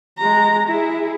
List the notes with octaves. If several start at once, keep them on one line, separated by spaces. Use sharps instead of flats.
G#3 A#5
E4 G#4